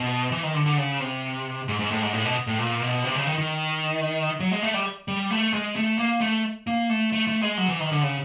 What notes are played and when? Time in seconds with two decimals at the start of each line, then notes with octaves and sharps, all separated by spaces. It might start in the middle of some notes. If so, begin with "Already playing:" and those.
Already playing: B2
0.32 E3
0.43 D#3
0.54 D3
0.66 D3
0.78 C#3
1.00 C3
1.68 G#2
1.79 G#2
1.91 A2
2.02 G#2
2.13 A2
2.25 B2
2.47 A2
2.59 A#2
2.81 B2
3.04 C3
3.15 C#3
3.27 D#3
3.38 D#3
4.40 F#3
4.51 G#3
4.63 A3
4.74 G3
5.08 G3
5.30 A3
5.53 G#3
5.76 A3
5.99 A#3
6.21 A3
6.67 A#3
6.89 A3
7.12 A3
7.27 A3
7.42 G#3
7.58 F#3
7.69 E3
7.80 D#3
7.92 D3
8.03 C#3